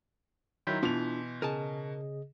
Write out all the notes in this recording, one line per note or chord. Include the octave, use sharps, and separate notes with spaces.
D#3 F#3 E4 C6 G6 B6
B2 E3 D4 F4 F7
C#3 G#4 A#4 D#5 G#5 A5